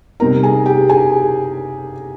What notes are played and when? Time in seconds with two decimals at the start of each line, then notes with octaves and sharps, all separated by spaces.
0.20 C3 G3 C4 D#4 A#4 A#5
0.43 G#4 G#5
0.66 G4 G5
0.90 G#4 G#5